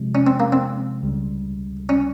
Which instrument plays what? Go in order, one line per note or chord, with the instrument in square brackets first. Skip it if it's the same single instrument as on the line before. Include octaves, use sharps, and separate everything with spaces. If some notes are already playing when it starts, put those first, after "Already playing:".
Already playing: [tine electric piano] C3 F3 G#3
[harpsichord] C#4
C4
A#3
C4
[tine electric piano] C#2 C#3 G3
[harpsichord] C#4